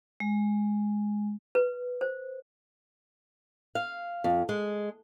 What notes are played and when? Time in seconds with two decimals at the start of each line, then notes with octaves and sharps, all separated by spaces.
0.20 G#3
1.55 B4
2.01 C5
3.75 F5
4.24 F2
4.49 G#3